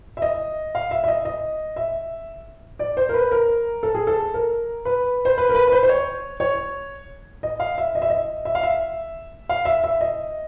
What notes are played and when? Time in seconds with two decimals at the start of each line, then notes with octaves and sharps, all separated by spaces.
0.17 E5
0.22 D#5
0.75 F5
0.91 E5
1.04 E5
1.08 D#5
1.25 D#5
1.76 E5
2.79 D5
2.97 C5
3.09 A#4
3.14 B4
3.32 A#4
3.83 A4
3.95 G#4
4.07 A4
4.34 A#4
4.85 B4
5.25 C5
5.38 B4
5.49 A#4
5.55 B4
5.67 B4
5.72 C5
5.83 C5
5.89 C#5
6.40 C#5
7.43 D#5
7.60 F5
7.78 E5
7.95 D#5
8.02 E5
8.10 D#5
8.45 E5
8.55 F5
8.63 E5
9.49 F5
9.65 E5
9.84 E5
10.01 D#5